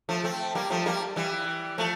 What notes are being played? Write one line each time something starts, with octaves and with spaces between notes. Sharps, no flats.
F3 A3
A3 C4
G3 A#3
F3 A3
G3 A#3
E3 G3
F3 A3